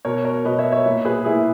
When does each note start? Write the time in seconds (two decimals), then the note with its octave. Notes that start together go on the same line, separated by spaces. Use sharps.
0.05 B2 A#4 C#5
0.25 A#4 C#5
0.45 B2 B4 D#5
0.59 C#5 E5
0.72 C#5 E5
0.86 A#2
1.05 G#4 B4
1.25 A#2 E4 G#4